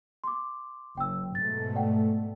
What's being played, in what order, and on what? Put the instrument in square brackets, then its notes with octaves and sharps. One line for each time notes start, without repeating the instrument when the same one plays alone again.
[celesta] C6 D6
[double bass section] F#1 [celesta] G5 E6
[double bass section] G#2 B2 A3 [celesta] A6
[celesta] D5 F#5 G5